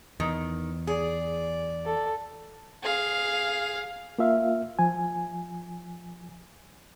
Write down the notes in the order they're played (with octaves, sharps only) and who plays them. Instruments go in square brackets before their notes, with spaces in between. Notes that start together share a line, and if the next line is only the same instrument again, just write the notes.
[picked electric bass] E2 [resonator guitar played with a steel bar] D#3
[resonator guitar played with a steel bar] G#4 [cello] D5
[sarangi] A4
[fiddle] G#4 F5
[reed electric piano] A#3 F4 E5 F5
F3 G#5